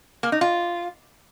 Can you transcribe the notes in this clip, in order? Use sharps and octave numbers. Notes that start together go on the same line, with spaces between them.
A#3
D#4
F4